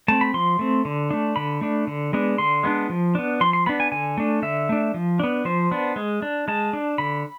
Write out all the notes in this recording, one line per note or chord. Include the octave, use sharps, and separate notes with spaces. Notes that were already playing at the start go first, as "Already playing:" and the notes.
A3 C4 A5
B5
F3 C6
A3 C4
D3
A3 D4
D3 B5
A3 D4
D3
G#3 B3 D4
D3 C6
G#3 B3 D4
F3
B3 D4
F3 C6
C6
B3 D4 B5
G#5
D3 G#5
A3 D4
D3 E5
A3 D4
F3
B3 D4
F3 C5
B3 D4
G#3
D4
G#3 A5
D4
D3 B5